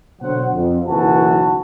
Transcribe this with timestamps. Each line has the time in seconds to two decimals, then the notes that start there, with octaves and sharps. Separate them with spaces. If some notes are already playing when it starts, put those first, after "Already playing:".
0.22 B2 D3 F#3 C5 F#5
0.53 F2
0.87 F#1 B1 E3 F#4 A5